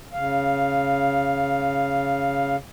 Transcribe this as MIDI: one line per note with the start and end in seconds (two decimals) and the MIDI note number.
0.13 2.56 49
0.13 2.56 77